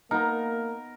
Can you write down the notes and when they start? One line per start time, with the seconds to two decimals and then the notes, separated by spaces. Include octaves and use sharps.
0.11 A#3 B3 D#4 A#4